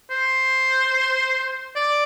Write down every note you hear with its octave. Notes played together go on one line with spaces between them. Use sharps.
C5
D5